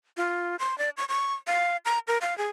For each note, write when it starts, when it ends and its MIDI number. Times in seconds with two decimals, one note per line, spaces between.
0.17 0.56 65
0.59 0.78 84
0.78 0.90 74
0.97 1.05 85
1.09 1.33 85
1.47 1.77 77
1.85 1.99 82
2.08 2.18 70
2.21 2.36 77
2.38 2.49 68